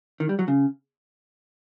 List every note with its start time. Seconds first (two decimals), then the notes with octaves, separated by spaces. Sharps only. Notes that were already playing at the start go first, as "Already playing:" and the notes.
0.20 D#3
0.29 G3
0.39 F#3
0.48 C#3